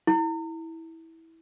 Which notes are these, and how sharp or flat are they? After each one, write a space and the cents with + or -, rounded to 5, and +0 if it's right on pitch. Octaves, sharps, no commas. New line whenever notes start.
E4 -15